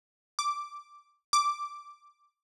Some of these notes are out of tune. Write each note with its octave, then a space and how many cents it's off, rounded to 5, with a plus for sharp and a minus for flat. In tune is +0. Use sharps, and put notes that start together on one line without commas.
D6 -5
D6 -5